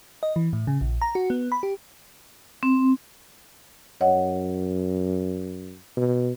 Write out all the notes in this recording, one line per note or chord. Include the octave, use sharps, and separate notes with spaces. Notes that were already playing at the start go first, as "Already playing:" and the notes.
D#5
E3
A2
C#3
A#1
A#5
F#4
B3
B5
G4
C4
F#2 C#5 D#5 F#5
B2